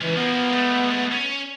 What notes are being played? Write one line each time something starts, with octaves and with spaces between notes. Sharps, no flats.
C#2 E3
F3 A#3 B3
G#3 A3
C#4